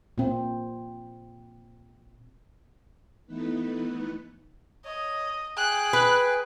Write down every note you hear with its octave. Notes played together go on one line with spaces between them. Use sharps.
A#2 C4
E3 A3 B3 D#4 B4
C#5 D#5
G#4 G5 G#5 F#6
B4